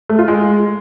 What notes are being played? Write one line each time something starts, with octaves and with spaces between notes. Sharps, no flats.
A3
F4
G#3